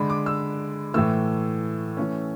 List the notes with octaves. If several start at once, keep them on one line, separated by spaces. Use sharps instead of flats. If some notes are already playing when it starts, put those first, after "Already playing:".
Already playing: D3 G#3 D4 B5
D6
E6
A2 E3 A3 E6
E3 A3 C#4